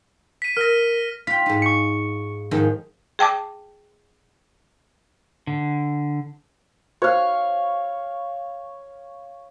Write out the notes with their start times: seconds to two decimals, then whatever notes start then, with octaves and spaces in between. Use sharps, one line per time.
0.42 B6 D#7
0.57 A#4 F6 A#6
1.27 F4 G5 B6
1.46 G#2 D#4
1.62 C#6 C#7
2.51 G#2 D#3 F3
3.19 G#4 G5 A5 D6
5.47 D3
7.02 F#4 C5 C#5 F5